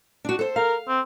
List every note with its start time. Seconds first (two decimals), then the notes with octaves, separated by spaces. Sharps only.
0.25 D4 F#4
0.39 A4 C5
0.56 A#4 F5
0.88 C4